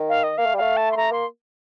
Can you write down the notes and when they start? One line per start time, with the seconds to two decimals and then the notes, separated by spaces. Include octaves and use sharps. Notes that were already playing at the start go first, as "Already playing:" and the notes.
Already playing: D#3
0.09 F5
0.23 D#5
0.38 A#3 F5
0.46 A3
0.53 G3
0.57 A3 F5
0.77 A5
0.92 C6
0.97 A3 A#5
1.12 A#3 C6